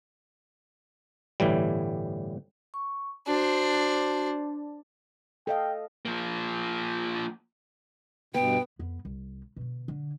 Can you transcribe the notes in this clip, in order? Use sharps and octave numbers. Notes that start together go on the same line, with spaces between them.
G1 A2 E3 G3
C#6
D4 F#4 C5
A4 D#5 F5 G5
F3 A#3
G2 B2 B3 G5
F2 B3
C2
B2 D3
D3